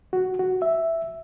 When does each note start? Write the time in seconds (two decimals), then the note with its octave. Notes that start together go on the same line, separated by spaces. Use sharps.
0.13 F#4
0.39 F#4
0.62 E5